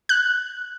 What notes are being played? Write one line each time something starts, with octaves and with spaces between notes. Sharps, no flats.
F#6